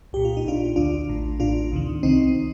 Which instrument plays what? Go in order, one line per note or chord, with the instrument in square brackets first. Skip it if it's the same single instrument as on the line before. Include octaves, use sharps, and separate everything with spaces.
[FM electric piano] C2 A#2 G4
F4
D#4
A#1 A#2 D4 F4
D2 D3 D4 F4
A1 A2
A1 A2 D4 F4
D2 C3 D#3
C2 C3 D#3 C4 D#4